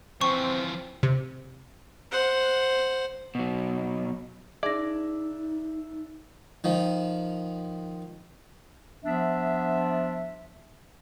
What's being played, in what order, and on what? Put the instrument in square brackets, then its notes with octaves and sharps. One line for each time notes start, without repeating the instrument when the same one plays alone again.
[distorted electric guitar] E3 F3 [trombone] C4 [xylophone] C#6
[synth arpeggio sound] C3
[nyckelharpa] C5 F#5
[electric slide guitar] B2 F#3
[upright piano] D4 E5 [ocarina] D#4 [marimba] G#4 A#6 [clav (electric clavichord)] D5
[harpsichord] D#3 F3
[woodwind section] F3 B3 D4 E5